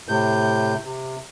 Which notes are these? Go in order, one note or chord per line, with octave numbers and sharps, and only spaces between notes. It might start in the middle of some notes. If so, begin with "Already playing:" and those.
A2 C3 G6
C3